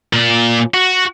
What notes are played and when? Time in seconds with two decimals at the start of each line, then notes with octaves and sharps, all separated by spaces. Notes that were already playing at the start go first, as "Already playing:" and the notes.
0.13 A#2 D5
0.74 F#4